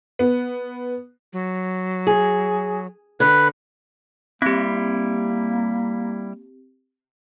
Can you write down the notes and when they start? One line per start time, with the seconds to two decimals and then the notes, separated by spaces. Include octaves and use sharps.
0.19 B3
1.33 F#3
2.07 G#4
3.20 D3 B4
4.42 G3 A#3 C4 E4 G4